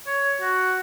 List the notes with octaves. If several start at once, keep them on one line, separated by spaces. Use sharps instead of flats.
C#5
F#4